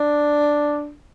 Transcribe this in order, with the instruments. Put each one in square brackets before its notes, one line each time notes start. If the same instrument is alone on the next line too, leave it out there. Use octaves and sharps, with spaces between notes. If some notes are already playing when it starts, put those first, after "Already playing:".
Already playing: [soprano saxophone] D4